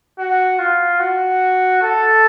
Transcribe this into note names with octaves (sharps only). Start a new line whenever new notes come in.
F#4
F4
F#4
A4